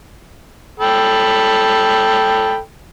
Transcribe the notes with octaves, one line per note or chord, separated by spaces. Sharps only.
A4 G5 B5